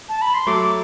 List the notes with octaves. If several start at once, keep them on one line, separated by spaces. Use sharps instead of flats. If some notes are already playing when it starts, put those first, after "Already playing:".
A5
B5
C6
F#3 A3 D6